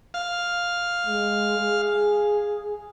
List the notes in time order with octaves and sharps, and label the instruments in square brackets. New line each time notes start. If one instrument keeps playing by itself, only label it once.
[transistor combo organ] F5
[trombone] G#3
G#4